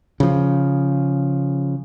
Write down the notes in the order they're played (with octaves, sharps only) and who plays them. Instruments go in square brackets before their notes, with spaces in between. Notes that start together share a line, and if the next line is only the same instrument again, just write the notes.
[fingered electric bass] C#3 F3